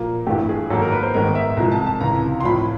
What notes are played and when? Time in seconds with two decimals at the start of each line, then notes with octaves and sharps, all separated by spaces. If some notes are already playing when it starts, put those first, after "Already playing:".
Already playing: A#2 F3 A#3
0.27 G2 E3 A3 G4
0.49 G#4
0.70 G#2 D#3 F#3 A#3 A4
0.81 A#4
0.92 B4
1.03 C5
1.14 G#2 D#3 G#3 B3 A#4
1.35 E5
1.57 C2 C3 F3 G#3 A#5
1.72 A5
1.87 A5
2.00 C#2 C3 E3 A#5
2.41 C6
2.45 A2 F3 A3 B5